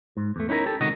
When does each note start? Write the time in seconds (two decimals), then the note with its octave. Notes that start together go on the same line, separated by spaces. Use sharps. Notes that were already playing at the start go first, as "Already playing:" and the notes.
0.17 G#2
0.36 E2 A3
0.49 C#4 D#4 E4 G4 A#4
0.66 G4 A4
0.81 C#2 C3 D#3 F#4 D#5